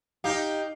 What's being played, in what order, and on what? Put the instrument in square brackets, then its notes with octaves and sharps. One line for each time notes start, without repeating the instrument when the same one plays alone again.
[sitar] D#4 G4 [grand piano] F5